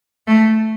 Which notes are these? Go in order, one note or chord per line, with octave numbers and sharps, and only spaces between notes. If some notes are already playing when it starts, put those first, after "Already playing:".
A3